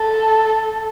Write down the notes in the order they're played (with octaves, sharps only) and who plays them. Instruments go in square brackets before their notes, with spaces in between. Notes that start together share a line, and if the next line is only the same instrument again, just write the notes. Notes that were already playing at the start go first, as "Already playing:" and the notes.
Already playing: [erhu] A4